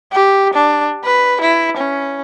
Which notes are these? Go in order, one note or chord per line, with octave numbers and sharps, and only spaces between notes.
G4
D4
B4
E4
C#4